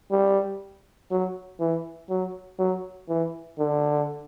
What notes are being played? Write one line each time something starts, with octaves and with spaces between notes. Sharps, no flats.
G3
F#3
E3
F#3
F#3
E3
D3